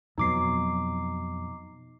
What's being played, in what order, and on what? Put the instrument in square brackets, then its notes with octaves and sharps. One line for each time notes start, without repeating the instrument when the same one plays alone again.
[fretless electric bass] F2 B2 F#3 [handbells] D#4 D6 C7